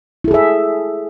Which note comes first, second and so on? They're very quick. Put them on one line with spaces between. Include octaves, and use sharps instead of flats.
E4 A4 G#4 E5